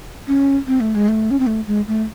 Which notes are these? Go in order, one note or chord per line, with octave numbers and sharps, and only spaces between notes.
C#4
C4
A3
G#3
A3
C#4
C4
A3
G#3
A3